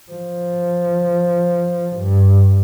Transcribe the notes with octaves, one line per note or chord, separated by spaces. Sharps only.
F3
G2